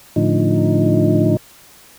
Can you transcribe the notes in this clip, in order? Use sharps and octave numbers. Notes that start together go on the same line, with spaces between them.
A2 D3 F3 D#4